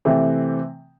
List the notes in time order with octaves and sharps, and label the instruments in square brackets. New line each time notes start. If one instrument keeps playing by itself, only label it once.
[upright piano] C3 E3 A3 C4